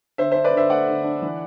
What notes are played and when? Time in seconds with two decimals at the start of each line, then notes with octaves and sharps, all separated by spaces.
0.18 D3 C5 E5
0.32 D4 C5 E5
0.44 B4 D5
0.54 D3 C5 E5
0.70 A3 D5 F#5
0.88 D3
1.05 D4
1.22 E3